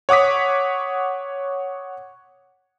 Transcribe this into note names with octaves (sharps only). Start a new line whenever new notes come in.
C#5 F#5 D6 D#6 B6